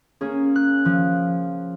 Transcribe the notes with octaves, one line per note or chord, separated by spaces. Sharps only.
A#3 C#4 G#4
F#6
F3